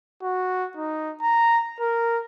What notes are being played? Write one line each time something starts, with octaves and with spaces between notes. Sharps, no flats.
F#4
D#4
A#5
A#4